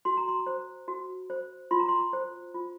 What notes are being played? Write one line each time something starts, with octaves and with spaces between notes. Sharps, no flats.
F#4 C6
A#5
C6
C5
F#4
C5
F4 C6
A#5
C6
C5
F4